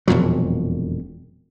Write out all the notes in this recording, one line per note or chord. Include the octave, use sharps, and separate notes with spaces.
E1 F2 A#2 F#3